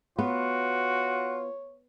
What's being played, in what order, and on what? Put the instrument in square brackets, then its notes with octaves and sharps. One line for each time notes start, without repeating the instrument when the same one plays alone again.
[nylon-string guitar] B3 [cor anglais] F4 [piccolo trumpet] F#4 [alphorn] C#5